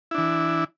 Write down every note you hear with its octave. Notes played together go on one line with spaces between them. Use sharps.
E3 D4 E4